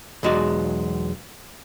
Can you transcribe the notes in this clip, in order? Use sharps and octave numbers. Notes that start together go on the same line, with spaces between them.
B1 E2 G#3 F#4 D5